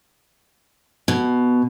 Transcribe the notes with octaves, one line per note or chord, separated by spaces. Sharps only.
B2